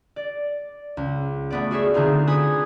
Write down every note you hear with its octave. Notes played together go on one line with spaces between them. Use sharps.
D5
C#2
A3 B3 D5
F#4 G#4 C#5 E5
D3 C4 D#4 F4 G#4
B4 G#5 D#6 G#6